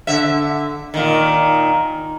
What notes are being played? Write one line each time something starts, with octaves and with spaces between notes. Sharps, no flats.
D3 E5
A#2 D#3